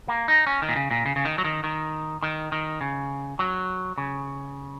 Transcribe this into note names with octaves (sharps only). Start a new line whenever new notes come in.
A#3
D#4
C#4
D#3
A#2
C#3
A#2
C#3
C#3
D#3
F#3
D#3
D#3
D#3
D#3
C#3
F#3
C#3